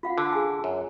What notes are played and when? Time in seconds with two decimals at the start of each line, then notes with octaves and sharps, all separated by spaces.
0.03 F4 F5 F#5
0.18 D3
0.33 G#4 G#5
0.64 F#2